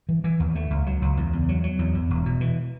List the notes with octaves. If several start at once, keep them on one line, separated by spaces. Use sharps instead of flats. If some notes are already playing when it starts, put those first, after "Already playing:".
E3
E3
D#2
A3
C#2
F#3
C#2
E2
E2
F#3
F#3
E2
E2
E1
B2
E3